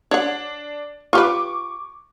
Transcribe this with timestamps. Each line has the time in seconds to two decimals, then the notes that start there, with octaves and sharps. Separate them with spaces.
0.11 D4 C#5 F#5
1.13 F4 G4 B4 C#6 D6